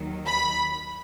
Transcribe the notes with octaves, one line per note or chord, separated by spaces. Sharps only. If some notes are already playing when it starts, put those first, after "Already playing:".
Already playing: D#2 D#3 F#3
B5